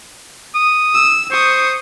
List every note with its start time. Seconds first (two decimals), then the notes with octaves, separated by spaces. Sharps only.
0.55 D#6
0.94 E6
1.31 C5 C#6 D#6